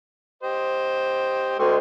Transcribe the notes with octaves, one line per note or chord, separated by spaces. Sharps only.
G4 C5 D#5
D2 G#3 G5 C6 C#6